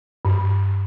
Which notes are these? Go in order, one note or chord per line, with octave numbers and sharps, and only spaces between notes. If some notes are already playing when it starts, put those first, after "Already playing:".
G2